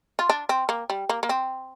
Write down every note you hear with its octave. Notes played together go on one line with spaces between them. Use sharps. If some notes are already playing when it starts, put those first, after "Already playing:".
F4
D4
C4
A#3
G3
A#3
A#3
C4